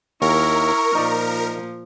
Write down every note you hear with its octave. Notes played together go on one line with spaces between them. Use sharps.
D#2 E4 A#4 C#6
A#2 F3 D#4 D5